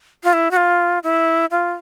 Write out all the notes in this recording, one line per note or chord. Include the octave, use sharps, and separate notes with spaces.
F4
E4
F#4
F4
E4
F4